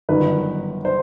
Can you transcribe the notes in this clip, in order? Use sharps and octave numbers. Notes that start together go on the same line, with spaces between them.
G1 F#2 D#3 B4
C5